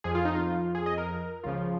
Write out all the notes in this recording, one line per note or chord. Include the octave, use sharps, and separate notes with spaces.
F2 F3 G#4
F4
D#4
F4
G#4
D#5
A#4
C#2 C#3 F3 F4